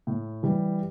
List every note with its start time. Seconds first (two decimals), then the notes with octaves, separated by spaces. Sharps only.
0.07 A2
0.43 E3 G3